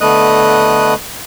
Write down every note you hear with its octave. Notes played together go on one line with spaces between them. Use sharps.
D3 A3 B3 D#5 D#6 F#6